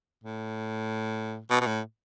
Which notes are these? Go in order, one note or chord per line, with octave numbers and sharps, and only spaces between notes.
A2
B2
B2
A2